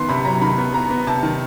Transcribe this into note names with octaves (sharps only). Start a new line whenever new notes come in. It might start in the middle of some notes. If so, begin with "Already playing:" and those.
Already playing: D#3 B3 C6
C3 B5
F#3 A#5
D#3 B5
B3
B3 A#5
B3
C3 A5
D#3